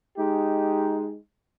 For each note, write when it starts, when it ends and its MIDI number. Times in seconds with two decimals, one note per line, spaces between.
0.18 1.17 56
0.18 1.17 63
0.18 1.17 67